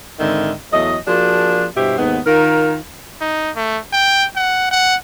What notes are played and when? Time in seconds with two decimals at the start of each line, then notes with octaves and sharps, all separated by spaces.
0.20 G#2 D3 D#3 C4 E5
0.72 E2 F#3 A3 D#5
1.07 F3 A#3 D4 F#4 G#4
1.76 G2 B2 E4 G4 C5
1.98 D#2 G#2 B3
2.26 D#3 F4 A#4
3.21 D#4
3.56 A3
3.93 G5
4.36 F#5
4.71 F#5